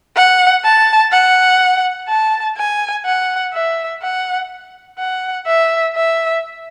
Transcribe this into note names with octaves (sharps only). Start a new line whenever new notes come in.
F#5
A5
F#5
A5
G#5
F#5
E5
F#5
F#5
E5
E5